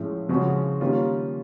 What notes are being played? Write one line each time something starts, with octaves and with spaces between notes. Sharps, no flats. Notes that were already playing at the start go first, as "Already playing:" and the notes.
Already playing: A2 F3 G#3 C#4
C#3 F3 G#3 C#4 F#4
D#3 G3 A#3 C#4 F4